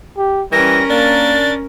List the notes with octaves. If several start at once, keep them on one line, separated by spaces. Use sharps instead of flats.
G4
E3 G3 C#4 A#4 A#6
A#3 D4 A6